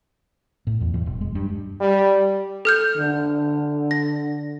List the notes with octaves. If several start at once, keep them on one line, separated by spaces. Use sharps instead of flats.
A2
E2
E2
E1
G#3
G2
G3
A4 F6 G6
D3
A#6